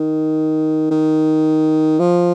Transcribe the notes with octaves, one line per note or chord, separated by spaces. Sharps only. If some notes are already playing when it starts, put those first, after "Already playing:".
Already playing: D#3
D#3
F3